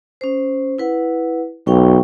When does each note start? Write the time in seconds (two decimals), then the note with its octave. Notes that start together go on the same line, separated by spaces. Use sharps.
0.21 C#4 C5
0.78 E4 B4 F#5
1.67 B1 F5 G5 C#6